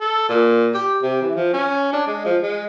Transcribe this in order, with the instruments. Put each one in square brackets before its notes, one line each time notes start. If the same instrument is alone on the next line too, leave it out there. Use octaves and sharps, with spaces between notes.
[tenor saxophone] A4
A#2
G4
C3
E3
F3
C#4
D4
G#3
F3
G#3